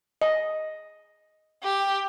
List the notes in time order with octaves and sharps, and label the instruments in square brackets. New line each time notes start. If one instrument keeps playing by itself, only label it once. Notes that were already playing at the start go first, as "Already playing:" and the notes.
[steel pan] D#5
[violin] G4